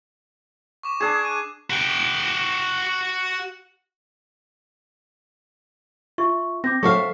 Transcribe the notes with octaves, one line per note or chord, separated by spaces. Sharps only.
C#6 D6 E7
D4 G#4 D6 G#6 E7
C#6 F#6 D#7
F#4 G5
F4 E5 C#6
C4 D6 G6 A#6
F#3 A4 C5 E5 F5 C#6